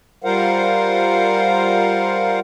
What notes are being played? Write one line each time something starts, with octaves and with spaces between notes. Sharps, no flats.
G3 F4 A#4 C5 F5 F#5